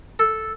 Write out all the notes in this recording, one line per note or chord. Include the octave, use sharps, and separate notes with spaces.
A4